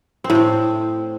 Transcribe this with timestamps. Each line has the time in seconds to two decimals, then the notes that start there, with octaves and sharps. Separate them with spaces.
0.24 C4
0.30 A2
0.35 C4